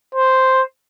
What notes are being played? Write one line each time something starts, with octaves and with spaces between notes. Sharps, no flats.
C5